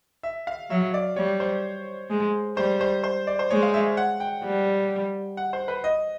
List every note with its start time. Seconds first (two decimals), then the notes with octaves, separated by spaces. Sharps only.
0.23 E5
0.47 F5
0.70 F#3 E5
0.94 D5
1.16 G3 C#5
1.40 C5
2.10 G#3
2.57 G3 C5
2.81 C5
3.04 C5
3.27 D5
3.39 C5
3.50 G#3 C#5
3.63 F5
3.74 E5
3.97 F#5
4.20 G5
4.44 G3
5.37 F#5
5.53 C5
5.68 B4
5.84 D#5